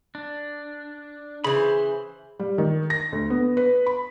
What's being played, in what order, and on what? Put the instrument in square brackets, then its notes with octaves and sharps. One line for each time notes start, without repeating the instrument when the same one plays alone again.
[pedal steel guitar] D4
[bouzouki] C#3 E3 [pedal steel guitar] C5 B5
[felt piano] G3
D#3
A#6
D2
B3
B4
B5